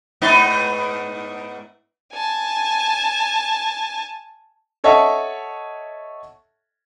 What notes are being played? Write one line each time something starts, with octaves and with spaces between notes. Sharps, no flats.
G#2 B3 D#4
G#5 A5
A4 C#5 D#5 E5 F#5 A5